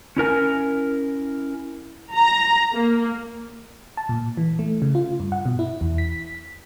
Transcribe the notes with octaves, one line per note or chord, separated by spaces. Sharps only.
C#4 E4 A#4 G#5
A#5
A#3
A5
A#2
E3
A3
C#3
F4
G2
F#5
B2
E4
E2
B6